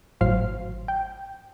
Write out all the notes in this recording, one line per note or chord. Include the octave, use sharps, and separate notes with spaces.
G#1 A2 F#3 C5 F5 C7
G5